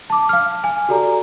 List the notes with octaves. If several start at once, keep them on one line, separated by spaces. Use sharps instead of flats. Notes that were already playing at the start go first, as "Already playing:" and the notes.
A5 D6
F5 F6
G#5
F#4 G4 A4 D5 A#5